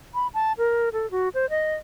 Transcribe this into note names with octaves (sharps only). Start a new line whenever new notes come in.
B5
A5
A#4
A4
F#4
C5
D#5